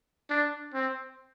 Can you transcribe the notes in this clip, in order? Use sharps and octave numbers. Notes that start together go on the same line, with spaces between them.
D4
C4